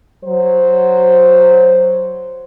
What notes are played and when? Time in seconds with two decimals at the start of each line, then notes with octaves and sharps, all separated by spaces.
0.25 F#3 C5